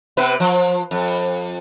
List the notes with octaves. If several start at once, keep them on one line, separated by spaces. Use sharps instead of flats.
C3 B3 B4
F3
F2